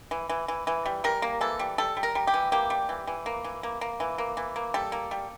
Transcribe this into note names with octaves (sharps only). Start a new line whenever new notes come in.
E3
E3
E3
E3
G3
G3 A#4
A#3
E3 A4
G3
G3 A4
G3
A#4
G3
G4
E3
A#3 G4
G3
E3
E3
A#3
E3
A#3
A#3
E3
A#3
E3
A#3
G3 A4
A#3
G3